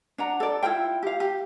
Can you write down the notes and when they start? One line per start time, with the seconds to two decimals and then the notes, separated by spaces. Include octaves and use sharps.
0.18 D4 F#5 A#5
0.40 A4 D5
0.63 E4 F4 A#4 G5
1.03 G4 F5
1.20 G4